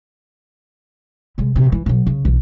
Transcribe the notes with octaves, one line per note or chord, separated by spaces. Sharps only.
C3 G#3
A#1 C3
E3
B2 F#3
C#3
B1 E3